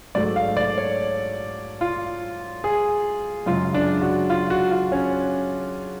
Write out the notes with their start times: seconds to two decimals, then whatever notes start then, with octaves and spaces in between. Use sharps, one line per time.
0.15 G#2 F#3 A3 D5
0.36 F5
0.57 D5
0.78 C#5
1.81 F4
2.64 G#4
3.46 F#2 C#3 G#3 F4
3.74 D4
4.02 F#4
4.30 F4
4.50 F#4
4.71 F4
4.92 C#4